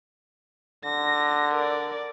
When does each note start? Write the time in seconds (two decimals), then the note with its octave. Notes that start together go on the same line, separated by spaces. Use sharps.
0.85 D3 A#6
1.54 A#4 D5